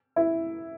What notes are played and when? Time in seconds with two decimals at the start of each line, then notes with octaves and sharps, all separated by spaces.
0.16 E4